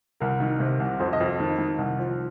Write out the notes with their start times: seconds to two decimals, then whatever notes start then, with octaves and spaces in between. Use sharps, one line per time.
0.20 C2 A#4
0.40 D#3
0.60 C3
0.80 C2
0.99 F2 C5
1.13 D#5
1.20 F2
1.40 D#3
1.59 D#3
1.78 C2
1.99 F3